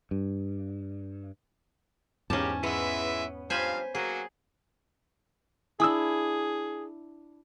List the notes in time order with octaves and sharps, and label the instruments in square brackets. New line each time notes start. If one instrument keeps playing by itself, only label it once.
[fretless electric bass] G2
[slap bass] E2 G#2 [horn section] A#3 G4 [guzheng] C#4 A5
[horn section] E3 G#3 E5 [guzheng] B3
[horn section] G2 F3 F5 [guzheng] C5 G#5 B5
[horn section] F#3 A#3 F#4 [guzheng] G#4
[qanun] D4 E4 [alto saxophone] G#4 [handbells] G#5 D#6 E6